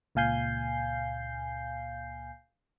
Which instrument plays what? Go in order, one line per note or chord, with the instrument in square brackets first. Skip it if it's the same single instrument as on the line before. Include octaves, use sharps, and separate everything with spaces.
[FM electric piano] C#2 A#2 F5 G#5 G6 C7